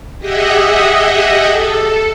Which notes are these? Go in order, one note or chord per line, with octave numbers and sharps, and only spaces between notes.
G4 G#4 D#5 E5 F#5
A4